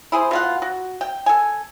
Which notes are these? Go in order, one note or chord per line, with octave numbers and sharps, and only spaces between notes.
E4 G#4 C5
B2 F4 F#5
F#4
G5
A4 G#5